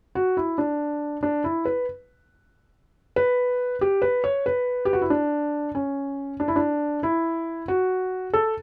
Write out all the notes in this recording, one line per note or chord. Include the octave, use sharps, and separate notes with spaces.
F#4
E4
D4
D4
E4
B4
B4
G4
B4
C#5
B4
G4
F#4
E4
D4
C#4
D4
E4
D4
E4
F#4
A4